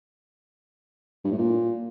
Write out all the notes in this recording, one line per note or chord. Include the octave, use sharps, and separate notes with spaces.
G2
A2
A#2